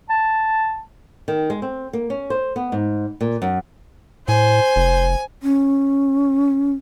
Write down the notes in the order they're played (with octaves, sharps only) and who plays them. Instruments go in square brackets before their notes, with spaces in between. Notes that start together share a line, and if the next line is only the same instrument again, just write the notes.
[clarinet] A5
[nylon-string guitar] D#3
G#3
C4
A#3
C#4
C5
B3
G#2
A#2
F#2
[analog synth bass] A2 [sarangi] C5 [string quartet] G#5
[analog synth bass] F1
[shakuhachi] C#4